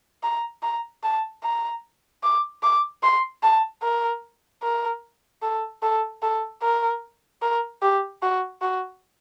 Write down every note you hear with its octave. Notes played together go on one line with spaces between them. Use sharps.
A#5
A#5
A5
A#5
D6
D6
C6
A5
A#4
A#4
A4
A4
A4
A#4
A#4
G4
F#4
F#4